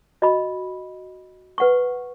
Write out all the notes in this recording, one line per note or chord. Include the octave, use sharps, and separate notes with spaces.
F#4 D#5 B5
B4 F#5 C#6